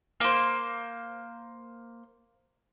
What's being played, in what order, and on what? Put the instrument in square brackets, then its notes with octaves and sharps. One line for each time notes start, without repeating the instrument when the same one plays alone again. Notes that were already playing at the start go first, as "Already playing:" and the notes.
[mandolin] A#3 C5